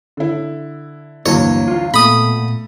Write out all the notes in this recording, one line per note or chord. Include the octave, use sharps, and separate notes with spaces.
D3 E4
D2 G2 E3 F#3 A#3 C#5
F4 F5
A#2 A3 B3 B5 D#6